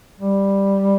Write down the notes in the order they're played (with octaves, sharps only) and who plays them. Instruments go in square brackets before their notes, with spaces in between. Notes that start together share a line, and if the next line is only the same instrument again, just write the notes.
[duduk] G3